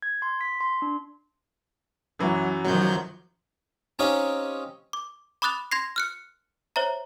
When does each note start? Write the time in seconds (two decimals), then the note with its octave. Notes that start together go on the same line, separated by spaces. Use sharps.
0.02 G#6
0.22 C6
0.41 B6
0.61 C6
0.82 D4
2.19 F#2 E3 F#3
2.65 D#3 F3 F#3 G6
3.99 C4 C#4 D#4 G4 D#5 F5
4.93 D6
5.42 B5 D6 D#6 F#6 A6 F7
5.72 C6 G#6 A#6 C7
5.96 F6 F#6 C#7
6.76 C5 C#5 E5 A#5